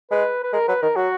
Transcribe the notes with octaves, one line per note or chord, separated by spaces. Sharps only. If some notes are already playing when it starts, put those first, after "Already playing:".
G#3 B4
B4
G#3 A#4
F#3 B4
D#3 A#4
F#3 F#4